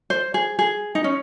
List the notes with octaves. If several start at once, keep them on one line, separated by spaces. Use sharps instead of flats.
C5
G#4
G#4
D#4
C#4